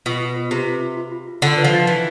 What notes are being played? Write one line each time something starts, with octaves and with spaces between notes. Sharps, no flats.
B2 F4
F4
B4
C3 F4
F4
F4
F4
F4
F4
D3 F4
B4
F3
F4
E3 B4